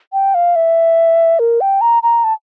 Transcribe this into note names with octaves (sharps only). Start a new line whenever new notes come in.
G5
F5
E5
A#4
G5
A#5
A#5
A5